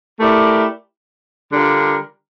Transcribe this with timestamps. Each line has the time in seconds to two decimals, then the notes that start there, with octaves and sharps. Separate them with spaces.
0.20 A3 E4 G4 A#4 D5
1.52 D3 G3 D4 F4 A#4